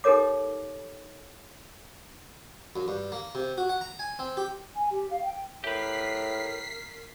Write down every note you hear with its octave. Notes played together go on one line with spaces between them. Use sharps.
D#4 G4 A4 A#4 C#5 D6
F#2
G2
A#3
C3
F#4
F#5
A#5
G#5
C4
G4
G#5
G4
F5
G5
A2 G4 A#4 B4 B6 C7